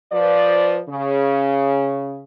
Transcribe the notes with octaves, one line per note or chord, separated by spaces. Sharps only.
F3 B4 D5
C#3